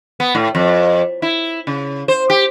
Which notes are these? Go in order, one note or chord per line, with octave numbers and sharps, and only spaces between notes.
B3
A2
F2
E4
C#3
C5
G4